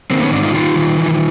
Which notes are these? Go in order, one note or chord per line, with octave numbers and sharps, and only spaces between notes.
D#3 A#3 C4
B3 C#4
G#2 C4 D4
D#4 F4
D#3 D#4 F4
D#3
E3